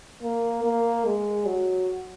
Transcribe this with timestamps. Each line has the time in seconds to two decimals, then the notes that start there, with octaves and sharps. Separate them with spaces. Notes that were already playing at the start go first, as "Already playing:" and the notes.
0.23 A#3
0.64 A#3
1.05 G#3
1.46 F#3